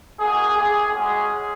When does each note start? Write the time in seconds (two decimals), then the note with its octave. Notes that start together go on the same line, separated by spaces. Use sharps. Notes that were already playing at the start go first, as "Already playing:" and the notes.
0.19 A#3 D#4 F#4 G#4
0.55 C4 E4 G4 G#4
0.93 G#3 C#4 F#4 G#4